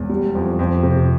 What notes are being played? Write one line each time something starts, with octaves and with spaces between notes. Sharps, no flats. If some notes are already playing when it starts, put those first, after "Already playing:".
Already playing: E1 E2
G3
F2
F2
C3